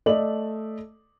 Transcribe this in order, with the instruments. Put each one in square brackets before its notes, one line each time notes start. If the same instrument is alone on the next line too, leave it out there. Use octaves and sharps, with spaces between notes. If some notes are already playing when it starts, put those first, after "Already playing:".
[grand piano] A3 A4 F#7 [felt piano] D5 D#5